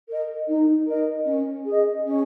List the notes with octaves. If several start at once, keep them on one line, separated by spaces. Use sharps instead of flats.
A#4 D#5
D#4
A#4 D#5
C#4
G#4 D#5
C#4